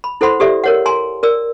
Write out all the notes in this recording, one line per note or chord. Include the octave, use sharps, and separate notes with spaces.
B5
E4 A4 C5 F#5 B5 C6
G4 A4 D5 E5
A#4 C#5 F#5
G#5 A#5 C6
A#4 D5 E6